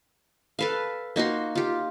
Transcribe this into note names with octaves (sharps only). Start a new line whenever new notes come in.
A4 B4 F5
A#3 D#4 F#4 C6
F4 G4